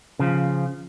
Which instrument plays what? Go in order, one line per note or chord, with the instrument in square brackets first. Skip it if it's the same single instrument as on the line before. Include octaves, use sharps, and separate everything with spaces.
[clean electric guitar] C#3 F3